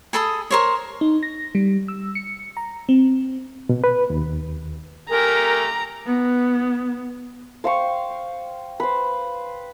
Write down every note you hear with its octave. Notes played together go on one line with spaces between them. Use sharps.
G#4 A4 B5 D#6
A#4 C5 C#5
D#4
A#6
G3
E6
C#7
A#5
C4
B2
B4
D#2
A3 G4 A#4 G#5 A#5
B3
C5 F5 G5 C#6
B4 C5